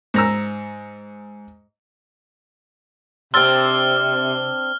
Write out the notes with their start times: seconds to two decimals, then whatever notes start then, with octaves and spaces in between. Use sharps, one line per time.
0.14 G#2 A#5 E6
3.34 C3 C4 D4 C6 E6 F6 A6 G7